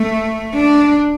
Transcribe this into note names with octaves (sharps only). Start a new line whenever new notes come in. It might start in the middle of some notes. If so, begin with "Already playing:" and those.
Already playing: A3
D4